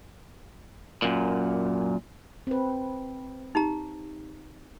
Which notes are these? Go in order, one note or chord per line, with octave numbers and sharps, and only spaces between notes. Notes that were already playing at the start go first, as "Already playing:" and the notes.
F#2 A#2
C4 B4
D#4 G4 A#5